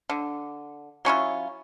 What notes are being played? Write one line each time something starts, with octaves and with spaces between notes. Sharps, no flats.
D3
F#3 C#4 E4 F4